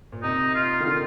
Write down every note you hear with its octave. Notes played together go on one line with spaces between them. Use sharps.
A#2
C3 D#4
F4
D#3
D3 F4